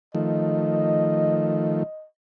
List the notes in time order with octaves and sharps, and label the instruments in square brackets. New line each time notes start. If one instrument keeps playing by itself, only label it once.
[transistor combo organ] D#3 F3 A3 [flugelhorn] D#5